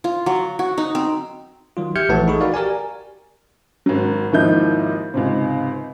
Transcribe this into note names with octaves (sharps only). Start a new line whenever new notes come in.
F4
F#3
F#4
D#4
C4
D#3 F#3 F4
G4 E5 F6 G6 G#6 C#7
A#1 E3 A3 B4 F#5 A5
D#4 G#4 A4 B5 C#6
F#4 A#4 D5 F5
G4 A#4 D5 G#5
G#1 F#3
G#1 D#2 F3 D#4 E4 G6
C#2 G#2 C3